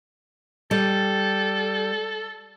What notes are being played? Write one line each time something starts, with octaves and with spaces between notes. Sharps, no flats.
G3 A4